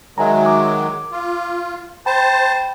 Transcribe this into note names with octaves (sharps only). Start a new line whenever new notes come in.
D#3 F#3 G#3 E5 G#5 A#5
D6
F4
C5 G5 A5 B5